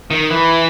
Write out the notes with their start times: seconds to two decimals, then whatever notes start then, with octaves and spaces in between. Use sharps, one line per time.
0.11 D#3
0.30 E3